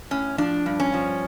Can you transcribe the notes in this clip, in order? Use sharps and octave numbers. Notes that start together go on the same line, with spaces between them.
A2 C#4
F3 D4
G2
C#4
F3